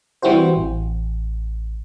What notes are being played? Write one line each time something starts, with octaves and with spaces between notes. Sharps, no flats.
E3 G3 C4 E4 F#4 C5
A1